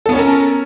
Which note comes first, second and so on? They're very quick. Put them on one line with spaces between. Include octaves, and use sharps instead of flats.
A4 B3 C#5 C#4 A#4